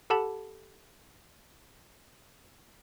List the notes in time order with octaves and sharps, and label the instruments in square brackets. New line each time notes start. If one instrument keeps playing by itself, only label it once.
[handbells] G4 A4 F#5 A5 B5